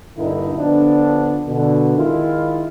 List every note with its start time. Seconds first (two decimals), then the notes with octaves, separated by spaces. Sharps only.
0.17 G2 A#2 D3 D#4 E4
0.57 D3 F3 B3 D4
1.48 B2 D3
1.97 D#3 G#3 E4 F4